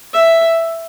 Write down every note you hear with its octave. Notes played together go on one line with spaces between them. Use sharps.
E5